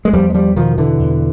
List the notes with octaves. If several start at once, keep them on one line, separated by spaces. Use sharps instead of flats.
G#3
E2 F3 G3
G#3
F3 G3
B2 D#3 F3
D3 E3
E2